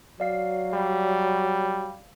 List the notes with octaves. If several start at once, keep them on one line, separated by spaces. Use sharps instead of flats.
F#3 D5 F5 C7
G3